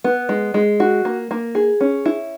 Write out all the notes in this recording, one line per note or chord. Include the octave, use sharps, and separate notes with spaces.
B3
G#3
G#3
F#4
A#3
A#3
G#4
C#4
E4